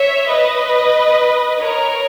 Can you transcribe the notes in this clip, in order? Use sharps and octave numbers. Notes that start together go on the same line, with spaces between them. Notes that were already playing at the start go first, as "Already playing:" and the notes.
Already playing: C#5 E5
B4 D#5
A#4 C#5